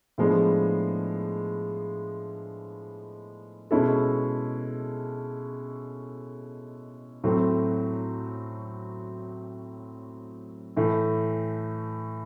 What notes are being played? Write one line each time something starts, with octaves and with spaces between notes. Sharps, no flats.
A2 F3 G#3 B3 D4
B2 G#3 C#4 E4 A4
A2 F#3 A3 C4
A2 E3 A3